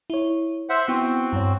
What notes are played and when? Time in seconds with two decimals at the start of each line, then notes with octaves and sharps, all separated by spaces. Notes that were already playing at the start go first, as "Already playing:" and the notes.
0.10 E4 C#5
0.69 C5 E5 F#5
0.88 B3 C4 E4 F#4
1.33 G2 C#5